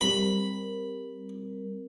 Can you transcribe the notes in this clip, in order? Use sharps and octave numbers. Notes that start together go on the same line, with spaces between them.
G3 C4 A#4 B5